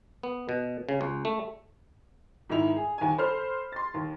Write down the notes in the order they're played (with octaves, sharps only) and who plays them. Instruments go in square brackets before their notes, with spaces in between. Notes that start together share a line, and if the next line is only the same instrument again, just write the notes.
[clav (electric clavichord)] B3
B2
C#3
C#2
A3
[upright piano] G#2 D#3 D#4 E4 F7
G#4
D#2 G#5
A4 C5 B5 F6
C6 A6
D#2